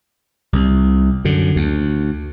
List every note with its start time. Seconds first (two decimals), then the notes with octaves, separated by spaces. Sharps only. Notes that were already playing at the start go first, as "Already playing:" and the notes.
0.53 C2
1.25 F#2 D3
1.56 D2